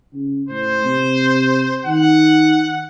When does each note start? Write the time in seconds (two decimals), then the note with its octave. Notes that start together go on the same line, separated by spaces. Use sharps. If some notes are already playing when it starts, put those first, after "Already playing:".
0.14 C#3
0.49 A2 C5
0.85 C3
1.85 D#3 F#5